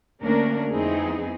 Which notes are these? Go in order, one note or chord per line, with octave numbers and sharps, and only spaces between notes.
D2 A#3 C#4 D4 A#4
F2 B3 C4 D#4 E4 G#4